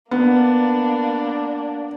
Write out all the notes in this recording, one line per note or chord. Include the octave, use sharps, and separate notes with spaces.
A#3 B3 D4